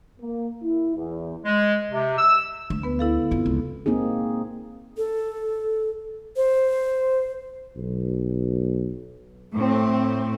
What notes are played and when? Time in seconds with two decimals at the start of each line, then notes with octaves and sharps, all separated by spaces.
0.20 A#3
0.63 E4
0.96 E2
1.45 G#3
1.91 C3
2.18 E6
2.70 D2
2.83 B3 B4
2.99 E4 A4 F5
3.31 F#2 B3 C4 F4
3.46 C#2
3.86 A#3 C4 D#4 G#4
4.97 A4
6.36 C5
7.76 B1
9.54 A2 A3 C4